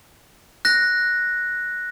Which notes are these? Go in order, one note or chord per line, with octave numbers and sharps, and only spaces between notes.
F#6 A#6